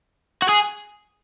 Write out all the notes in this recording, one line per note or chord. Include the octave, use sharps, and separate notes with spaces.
F#4
G#4